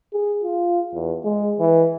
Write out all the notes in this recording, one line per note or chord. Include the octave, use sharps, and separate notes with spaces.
G#4
F4
E2
G#3
E3